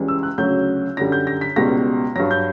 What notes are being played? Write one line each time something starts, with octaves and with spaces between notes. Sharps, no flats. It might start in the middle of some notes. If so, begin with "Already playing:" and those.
Already playing: C#2 C#3 E3 G3
E6
F#6
D2 C#3 F#3 G6
F#2 D3 G3 A#6
G6
A#6
B6
C#2 B2 G3 A#6
G2 F#3 A#6
G6